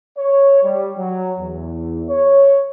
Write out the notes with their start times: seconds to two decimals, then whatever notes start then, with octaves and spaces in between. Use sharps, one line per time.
0.18 C#5
0.63 G3
0.98 F#3
1.40 E2
2.10 C#5